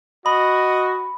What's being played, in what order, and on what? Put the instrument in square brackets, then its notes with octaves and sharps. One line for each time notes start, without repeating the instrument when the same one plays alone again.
[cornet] F#4 [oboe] D#5 [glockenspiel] B5